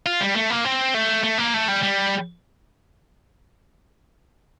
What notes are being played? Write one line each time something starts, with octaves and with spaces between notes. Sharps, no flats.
F4
G3
A3
A#3
C4
A3
A3
A#3
A3
G3
G3